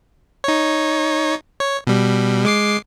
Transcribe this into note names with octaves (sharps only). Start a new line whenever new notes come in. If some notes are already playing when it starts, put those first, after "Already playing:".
D#4 C#5
C#5
B2 G3
G#3 D6 C7